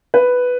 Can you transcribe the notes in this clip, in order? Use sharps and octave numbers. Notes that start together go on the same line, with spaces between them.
B4